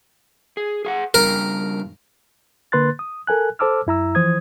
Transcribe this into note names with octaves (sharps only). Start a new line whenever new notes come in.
G#4
G#4 F5 F#5
C#3 G3 D4 A#4
D3 A#3 B4 C6 F#6 A6
D#6
A4 A#4 G#5 F#6
A4 C5 A5 D6 E6 F6
F#2 E4 A#5 E6
E3 F3 C5 D#6 G#6